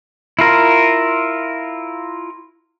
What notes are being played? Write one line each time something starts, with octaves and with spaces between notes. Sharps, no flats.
E4 F4 A#4